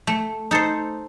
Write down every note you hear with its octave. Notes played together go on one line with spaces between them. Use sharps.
A3
D#4 A4 C5